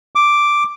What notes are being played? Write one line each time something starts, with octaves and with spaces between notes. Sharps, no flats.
D6